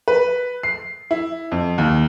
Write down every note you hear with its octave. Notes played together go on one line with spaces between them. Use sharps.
B4
C7
E4
F2
D#2